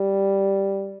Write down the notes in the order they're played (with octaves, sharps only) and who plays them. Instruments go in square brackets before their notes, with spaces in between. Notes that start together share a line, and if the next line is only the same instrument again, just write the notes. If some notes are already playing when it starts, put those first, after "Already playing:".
Already playing: [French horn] G3